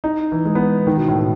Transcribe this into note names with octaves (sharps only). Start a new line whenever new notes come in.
D#4
E3
G#3
B3
D#3
B2
A2
B2